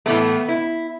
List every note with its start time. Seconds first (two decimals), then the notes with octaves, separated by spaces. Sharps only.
0.06 A2 E3 A3 B3
0.49 E4